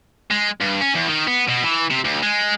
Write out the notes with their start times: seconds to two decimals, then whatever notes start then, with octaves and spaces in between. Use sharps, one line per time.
0.31 G#3
0.60 G2
0.81 C#4
0.95 E2
1.08 D#3
1.27 B3
1.49 B2
1.64 E3
1.91 C3
2.05 D2
2.23 G#3